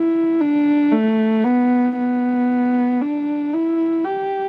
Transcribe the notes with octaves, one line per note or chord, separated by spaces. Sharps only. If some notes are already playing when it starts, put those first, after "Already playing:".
Already playing: E4
D4
A3
B3
B3
D4
E4
G4